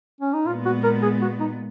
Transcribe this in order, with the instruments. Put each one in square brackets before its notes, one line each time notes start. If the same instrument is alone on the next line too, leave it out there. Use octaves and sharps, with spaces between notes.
[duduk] C#4
D#4
[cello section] A#2 G#3 B3 [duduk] F4
[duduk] F#4
A#4
G#4
F#4
D#4